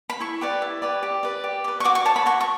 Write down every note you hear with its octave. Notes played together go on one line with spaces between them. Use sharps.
B5
E4 C#6
G4 B4 D5
E4
G4 B4 D5
G4
B4 D5
G4
B4 D5
C#6
F#4 D6
C#6
C#5 A5
B5
F#4 C#6
C#6